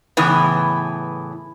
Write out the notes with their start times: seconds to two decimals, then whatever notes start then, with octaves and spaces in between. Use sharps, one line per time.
0.17 A2 C#3 E3 B3